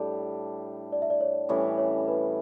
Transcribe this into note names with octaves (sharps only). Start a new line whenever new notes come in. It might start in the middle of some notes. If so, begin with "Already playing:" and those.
Already playing: A2 G3 D4 G4 D5
D5
E5
D5
C#5
A2 E3 G3 C#4 C#5
C#5
B4